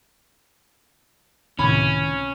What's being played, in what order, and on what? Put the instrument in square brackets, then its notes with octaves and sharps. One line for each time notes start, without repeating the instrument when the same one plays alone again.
[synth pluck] C#2 A2 C3 [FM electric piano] D#3 [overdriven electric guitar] C#4 [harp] B5